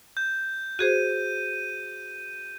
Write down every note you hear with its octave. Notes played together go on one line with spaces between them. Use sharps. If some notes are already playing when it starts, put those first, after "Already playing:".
G6
F#4 G#4 C5 D#7